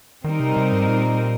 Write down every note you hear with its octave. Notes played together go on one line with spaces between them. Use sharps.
D#3 G3 C4 D#4 A#4
C3
C3
G#2
A#2